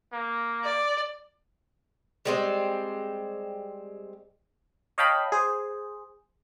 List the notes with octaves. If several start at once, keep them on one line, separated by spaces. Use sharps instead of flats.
A#3
D5
G3 G#3 C4
C#5 D#5 F5 G5 A5 B5
G#4 C5